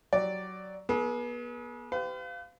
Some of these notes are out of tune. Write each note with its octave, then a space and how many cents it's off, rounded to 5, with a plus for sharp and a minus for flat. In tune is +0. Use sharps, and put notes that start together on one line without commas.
F#3 +15 G4 +0 D5 +0
B3 -35 G#4 +35
G4 -15 B4 +45 F5 +0